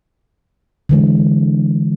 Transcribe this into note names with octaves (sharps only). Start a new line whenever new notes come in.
D3 E3 G#3